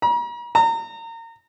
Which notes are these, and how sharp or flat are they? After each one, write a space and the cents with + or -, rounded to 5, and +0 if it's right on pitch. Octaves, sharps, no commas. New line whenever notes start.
A#5 +45
A#5 -30